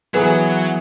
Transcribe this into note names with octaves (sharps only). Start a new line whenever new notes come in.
E3 F#3 B3 G#4 B4